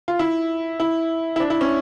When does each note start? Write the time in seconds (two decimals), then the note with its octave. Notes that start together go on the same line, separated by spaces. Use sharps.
0.08 F4
0.19 E4
0.80 E4
1.36 E4
1.40 D4
1.50 E4
1.61 C#4